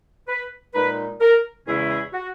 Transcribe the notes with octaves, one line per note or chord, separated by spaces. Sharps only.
B4
A#2 G#3 D#4 B4
A#4
E2 C#3 G#3 C#4 E4 G#4
G#4
F#4